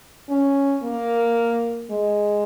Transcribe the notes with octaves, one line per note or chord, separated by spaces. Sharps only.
C#4
A#3
G#3